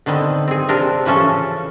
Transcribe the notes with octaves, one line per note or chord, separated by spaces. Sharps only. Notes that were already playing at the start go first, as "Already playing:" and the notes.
D3 D#3 B3 C4
C4 G#4
C3 C4 D4 A#4
C#3 E3 F3 C#4 A4